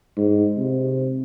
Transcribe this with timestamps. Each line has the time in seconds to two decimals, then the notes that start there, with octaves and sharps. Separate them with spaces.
0.17 G#2
0.58 C3